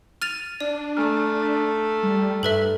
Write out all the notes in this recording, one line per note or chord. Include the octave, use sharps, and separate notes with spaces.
F6 A6 D#7 F7
D4 D5
A3 G#5 A#5 F6
G3
G2 A4 B4 E5